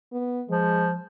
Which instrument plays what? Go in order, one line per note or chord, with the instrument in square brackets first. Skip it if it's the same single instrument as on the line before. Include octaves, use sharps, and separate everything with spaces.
[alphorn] B3
[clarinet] F3 [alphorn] G#3